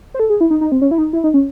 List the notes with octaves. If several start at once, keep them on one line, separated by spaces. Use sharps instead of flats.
C5
A4
G#4
E4
D#4
D#4
C4
C#4
E4
D#4
E4
D#4
C#4